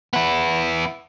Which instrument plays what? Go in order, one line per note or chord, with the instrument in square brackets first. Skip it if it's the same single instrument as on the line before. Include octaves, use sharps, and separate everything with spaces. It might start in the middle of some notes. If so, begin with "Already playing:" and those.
[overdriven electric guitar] B3 E4